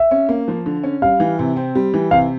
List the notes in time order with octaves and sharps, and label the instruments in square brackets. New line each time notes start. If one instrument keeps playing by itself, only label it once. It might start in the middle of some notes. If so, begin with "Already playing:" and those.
Already playing: [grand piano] E5
[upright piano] C#4
A#3
F3
D3
C#4
[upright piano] G3 [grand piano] F5
[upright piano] E3
C3
C4
G3
E3
[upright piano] C3 [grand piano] F5